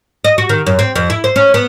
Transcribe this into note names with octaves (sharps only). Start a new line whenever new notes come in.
D#5
F#4
D#3
F#2
C4
F2
E4
C5
C#4
B3